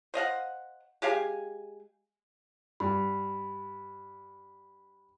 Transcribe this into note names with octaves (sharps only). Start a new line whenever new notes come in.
C5 D#5 F5 F#5
G#3 G4 F5 G#5
G2 B5